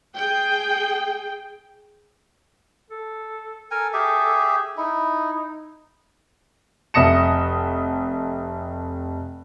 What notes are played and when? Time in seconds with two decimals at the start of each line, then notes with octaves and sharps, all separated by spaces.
0.16 G#4 G5
2.91 A4
3.71 A4 A#4 G#5
3.93 G4 G#4 E5
4.77 D#4 E4
6.94 F1 E5 D#6 A#6 C#7 E7